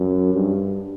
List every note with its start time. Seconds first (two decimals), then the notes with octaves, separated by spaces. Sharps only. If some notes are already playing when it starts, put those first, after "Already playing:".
Already playing: F#2
0.33 G2